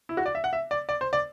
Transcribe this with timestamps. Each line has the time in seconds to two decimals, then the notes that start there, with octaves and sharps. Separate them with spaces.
0.09 E4
0.17 F#4
0.26 D5
0.35 E5
0.44 F#5
0.53 E5
0.71 D5
0.89 D5
1.01 C5
1.13 D5